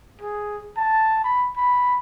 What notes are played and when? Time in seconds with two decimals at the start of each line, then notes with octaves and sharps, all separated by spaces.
0.22 G#4
0.77 A5
1.24 B5
1.57 B5